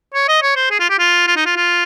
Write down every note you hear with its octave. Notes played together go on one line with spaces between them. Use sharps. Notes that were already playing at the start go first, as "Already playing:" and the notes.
C#5
D#5
C#5
C5
G#4
F4
G4
F4
F4
D#4
F4
F4